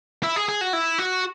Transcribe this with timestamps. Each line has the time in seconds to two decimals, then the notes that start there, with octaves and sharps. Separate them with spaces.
0.23 E4
0.36 G#4
0.49 G#4
0.61 F#4
0.73 E4
0.98 F#4